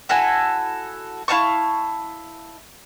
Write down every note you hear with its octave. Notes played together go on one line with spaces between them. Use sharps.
E4 F#4 A4 G#5
E4 F5 A5 C#6